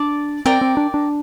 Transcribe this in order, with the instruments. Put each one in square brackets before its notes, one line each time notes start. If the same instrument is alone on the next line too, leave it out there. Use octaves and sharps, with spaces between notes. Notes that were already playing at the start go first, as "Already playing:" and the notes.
Already playing: [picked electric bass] D4 [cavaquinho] D5 A5 D6
[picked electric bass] C4 [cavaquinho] A#4 D5 G5 A#5
[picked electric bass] C4
D4
D4